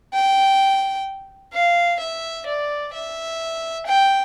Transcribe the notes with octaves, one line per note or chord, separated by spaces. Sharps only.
G5
F5
E5
D5
E5
G5